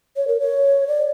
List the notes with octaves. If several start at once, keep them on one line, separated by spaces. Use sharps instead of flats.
C#5
A#4
C#5
D5